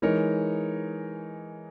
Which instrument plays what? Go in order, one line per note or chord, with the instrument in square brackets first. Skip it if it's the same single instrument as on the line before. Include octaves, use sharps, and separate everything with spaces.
[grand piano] E3 G#3 D#4 A#4 C#5